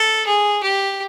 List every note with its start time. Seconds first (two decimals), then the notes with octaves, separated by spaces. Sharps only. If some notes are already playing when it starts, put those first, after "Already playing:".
Already playing: A4
0.27 G#4
0.63 G4